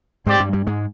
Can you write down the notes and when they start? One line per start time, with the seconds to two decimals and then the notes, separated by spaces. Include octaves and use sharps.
0.26 G#2 G#3 C4 G4 D5 G5
0.40 G2 G3
0.53 G2 G3
0.67 G#2 G#3